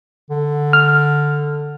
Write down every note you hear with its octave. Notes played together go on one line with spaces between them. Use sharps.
D3
F6